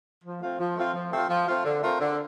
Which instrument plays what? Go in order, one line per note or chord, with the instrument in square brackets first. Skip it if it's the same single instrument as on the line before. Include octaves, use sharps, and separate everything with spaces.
[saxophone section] F3
A3 C4 F4
F3
A3 C4 F4
F3
A3 C4 F4
F3
A3 C4 F4
D3
A3 C4 F4 A#4
D3